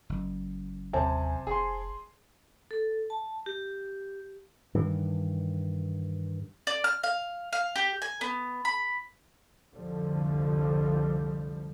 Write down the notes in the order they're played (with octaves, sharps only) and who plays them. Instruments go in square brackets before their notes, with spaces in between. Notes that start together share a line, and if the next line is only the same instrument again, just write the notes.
[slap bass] F#1
[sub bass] D#2 [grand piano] C3 [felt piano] C5 G#5 A5
[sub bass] F1 [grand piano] G#4 C6
[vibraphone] A4
A5
G4
[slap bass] G2 D#3 E3
[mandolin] D5
F6
F5
F5
G4
G#5
B3
B5
[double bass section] C2 F2 D3 F3 G3